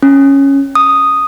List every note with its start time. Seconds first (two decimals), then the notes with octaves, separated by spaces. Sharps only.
0.03 C#4
0.75 D#6